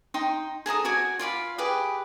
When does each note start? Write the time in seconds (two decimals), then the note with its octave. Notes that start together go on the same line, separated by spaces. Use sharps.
0.14 D#4 G5 C6
0.66 G#4 A4 A#5 D#6
0.85 F#4 D5 G#5
1.19 F4 D5 F5 B5
1.58 G4 G#4 B4 D6